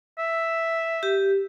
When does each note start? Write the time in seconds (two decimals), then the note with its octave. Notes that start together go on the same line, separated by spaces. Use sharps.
0.19 E5
1.03 G4